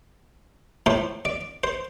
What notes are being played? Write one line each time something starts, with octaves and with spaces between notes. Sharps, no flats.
A2 A3 C5
D5
C5